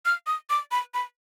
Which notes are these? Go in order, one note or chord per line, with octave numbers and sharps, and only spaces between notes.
F6
D#6
D6
B5
B5